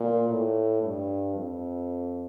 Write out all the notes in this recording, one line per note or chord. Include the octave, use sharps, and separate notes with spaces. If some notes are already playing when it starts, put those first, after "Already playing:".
Already playing: A#2
A2
G2
F2